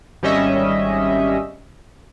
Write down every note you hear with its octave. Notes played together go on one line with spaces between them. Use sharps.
G#1 G3 C#4 D#5 E5